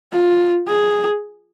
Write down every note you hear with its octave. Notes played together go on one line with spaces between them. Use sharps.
F4
G#4